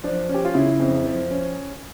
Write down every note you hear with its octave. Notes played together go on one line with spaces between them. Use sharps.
F3 D4
C#4
G4
F4
C#3 E4
F2
F3
C#4